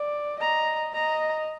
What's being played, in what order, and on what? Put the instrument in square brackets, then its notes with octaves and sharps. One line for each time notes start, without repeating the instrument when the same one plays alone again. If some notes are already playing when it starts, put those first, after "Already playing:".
Already playing: [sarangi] D5
[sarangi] D#5 [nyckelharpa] A#5
[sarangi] D#5 [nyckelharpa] A#5